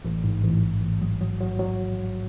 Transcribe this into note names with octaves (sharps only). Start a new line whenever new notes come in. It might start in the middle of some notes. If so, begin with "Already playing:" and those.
A1
G#2
A1
A1
A1
F#3
F#3
F#3
F#3